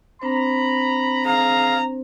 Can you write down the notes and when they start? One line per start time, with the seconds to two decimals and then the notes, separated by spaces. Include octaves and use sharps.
0.22 C4 D4 C5 A#5 B5
1.26 G#4 F5 A#5